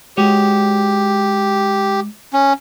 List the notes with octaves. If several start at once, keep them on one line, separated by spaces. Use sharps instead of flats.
G#3 F#4 G4 C#5
C#4